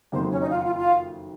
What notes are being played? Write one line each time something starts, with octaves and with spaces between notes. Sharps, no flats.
F#1 F2 D#3 F#3 A#3 C5
C#4 C#5
D#4 D#5
F4 F5
F#5
F4 F5
F4 F5